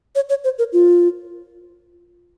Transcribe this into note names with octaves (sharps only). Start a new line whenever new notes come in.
C#5
C#5
C5
A#4
F4